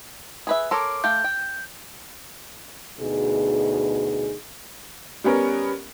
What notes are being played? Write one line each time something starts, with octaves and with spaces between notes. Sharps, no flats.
G#4 B4 E5
A4 A#4 C#5 C6 D6
A3 F5 G5 G6
G5
D2 B2 D#4 G#4
G3 B3 C#4 A#4